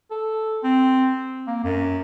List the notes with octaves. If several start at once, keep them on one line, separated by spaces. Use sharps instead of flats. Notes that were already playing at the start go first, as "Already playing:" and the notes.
A4
C4
A#3
F#2